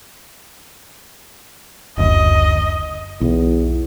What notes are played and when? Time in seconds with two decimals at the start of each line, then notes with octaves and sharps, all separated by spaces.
1.98 F#1 D2 D#5
3.21 B1 E2